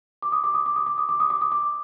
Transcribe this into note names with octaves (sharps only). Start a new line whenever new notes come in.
D6
D#6
D6
D#6
D6
D#6
D6
D#6
D6
D#6
D6
D#6
D6